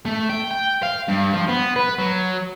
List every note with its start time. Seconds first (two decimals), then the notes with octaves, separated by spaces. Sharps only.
0.06 A3
0.30 G5
0.51 G5
0.83 F5
1.08 G2
1.33 F3
1.49 B3
1.76 B4
1.99 F#3